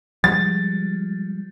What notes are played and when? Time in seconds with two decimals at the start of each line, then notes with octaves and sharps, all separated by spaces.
0.24 F3 G3 G#3 A6